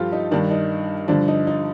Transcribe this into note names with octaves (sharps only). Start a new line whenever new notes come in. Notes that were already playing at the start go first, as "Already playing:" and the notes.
Already playing: G2 F3 F4 G4 A4
D#4
G2 D#3 D4
D#4
G2 D3 F3 D4
D#4
D#4